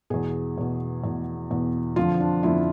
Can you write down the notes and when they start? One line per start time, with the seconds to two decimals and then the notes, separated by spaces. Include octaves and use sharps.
0.10 E2 B2 G#4
0.58 E2 B2
1.04 E2 B2
1.51 E2 B2
1.96 F2 D3 F3 F4
2.20 D4
2.43 F2 D3 F3 E4